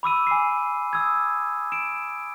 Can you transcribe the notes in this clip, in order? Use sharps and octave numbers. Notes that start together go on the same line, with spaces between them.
B5 D6 E6 D#7
G#5 C7
D#6 E6 G#6
D7 E7